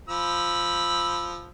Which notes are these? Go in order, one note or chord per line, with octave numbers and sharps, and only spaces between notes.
F3 B5 E6